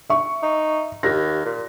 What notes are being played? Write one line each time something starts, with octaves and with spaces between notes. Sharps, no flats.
E5 C#6
D#4
D#2 G4 A#6
A#2